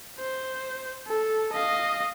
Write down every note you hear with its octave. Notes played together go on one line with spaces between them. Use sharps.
C5
A4
D#5 F5